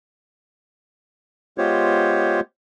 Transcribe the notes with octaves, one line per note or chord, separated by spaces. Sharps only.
G#3 B3 F4 G4 C5 C#5